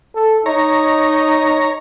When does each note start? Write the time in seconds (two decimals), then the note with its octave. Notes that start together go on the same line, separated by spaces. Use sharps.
0.15 A4
0.46 D#4 C#5 A#5